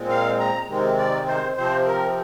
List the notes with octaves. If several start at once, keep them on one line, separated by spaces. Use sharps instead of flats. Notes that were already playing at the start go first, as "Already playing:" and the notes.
Already playing: A#2 G#3 C4
F5
A#5
C3 D#3 G#3 C4
D5
C5
C3 F3 C4 C5
A#4